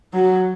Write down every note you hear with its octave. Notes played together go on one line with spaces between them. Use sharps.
F#3